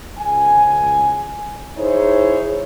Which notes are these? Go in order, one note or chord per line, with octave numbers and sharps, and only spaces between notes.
C#2 G#5
D#4 E4 G#4 C5 C#5